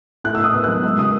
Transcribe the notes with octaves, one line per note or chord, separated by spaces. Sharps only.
A2 F#6
E6
A2 D#6
B3 E6
F#6
F#3
G#3 E6
C#3 D#6